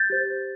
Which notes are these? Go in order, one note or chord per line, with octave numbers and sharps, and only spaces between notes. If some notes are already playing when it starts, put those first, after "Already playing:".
Already playing: G6 A6
G4 C5